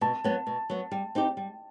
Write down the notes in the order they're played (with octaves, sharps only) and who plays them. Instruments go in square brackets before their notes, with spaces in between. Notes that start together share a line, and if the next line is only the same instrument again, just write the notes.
[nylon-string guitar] B2 [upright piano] A5
[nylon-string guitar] F#3 B3
B2
F#3 B3
G3
C4 D#4 G4
G3